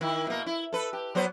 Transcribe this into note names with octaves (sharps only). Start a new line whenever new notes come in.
D#3 E4
B2 A#3
E4
A4 B4
G4
F#3 B3 C5